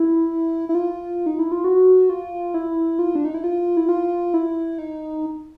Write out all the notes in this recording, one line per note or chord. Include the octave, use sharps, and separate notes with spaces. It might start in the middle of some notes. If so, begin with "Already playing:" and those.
Already playing: E4
E4
F4
D#4
E4
F4
F#4
F4
E4
F4
D4
D#4
E4
F4
E4
F4
E4
D#4